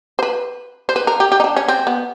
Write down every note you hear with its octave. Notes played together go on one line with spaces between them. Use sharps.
C5
B4
C5
B4
A#4
G4
G4
D#4
D4
C#4
C4
B3